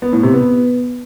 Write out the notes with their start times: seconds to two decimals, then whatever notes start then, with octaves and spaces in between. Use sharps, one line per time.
0.02 B3
0.13 A2
0.23 C3
0.34 B3